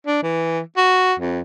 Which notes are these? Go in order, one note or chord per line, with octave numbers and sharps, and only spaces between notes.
D4
E3
F#4
F2